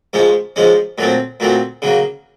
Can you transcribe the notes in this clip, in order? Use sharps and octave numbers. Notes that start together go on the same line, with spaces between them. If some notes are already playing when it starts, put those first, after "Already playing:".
G#2 F3 G#3 C#4
G#2 F3 G#3 C#4
A#2 F#3 A3 C4
A#2 F#3 A3 C4
C#3 F#3 A#3